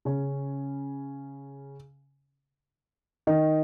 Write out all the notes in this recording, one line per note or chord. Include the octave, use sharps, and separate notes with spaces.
C#3 C#4
D#3 D#4